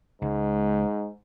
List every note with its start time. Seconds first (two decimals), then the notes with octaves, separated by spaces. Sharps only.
0.22 C#2 G#2